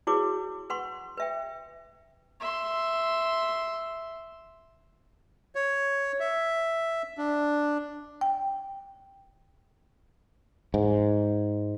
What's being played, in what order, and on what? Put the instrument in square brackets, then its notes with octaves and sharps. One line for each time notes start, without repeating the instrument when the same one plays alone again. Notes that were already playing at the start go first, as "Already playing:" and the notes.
[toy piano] E4 F#4 G#4 B4 C#5 D6
B4 F#5 C6 C#6
B4 E5 G5
[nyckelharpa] E5 C6
[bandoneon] C#5
E5
D4
[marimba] G5
[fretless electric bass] G#2